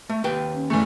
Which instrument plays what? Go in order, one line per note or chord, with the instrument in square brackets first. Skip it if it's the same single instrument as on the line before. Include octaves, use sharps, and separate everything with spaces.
[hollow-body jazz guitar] A3
D#2 B4 G5
[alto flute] C#4
[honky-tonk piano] F1 E3 A3